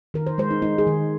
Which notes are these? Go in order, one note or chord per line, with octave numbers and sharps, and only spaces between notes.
D#3 A#4
C5
G#3 C5
D#4
G#3 D#4
G#4
D#3